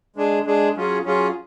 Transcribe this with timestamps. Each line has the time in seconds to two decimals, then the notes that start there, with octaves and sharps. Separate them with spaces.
0.16 G#3 D4 G#4
0.46 G#3 D4 G#4
0.75 F#3 C#4 F4 G#4
1.05 F#3 C#4 F4 G#4